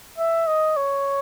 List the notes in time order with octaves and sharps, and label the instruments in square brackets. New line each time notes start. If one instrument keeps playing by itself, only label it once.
[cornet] E5
D#5
C#5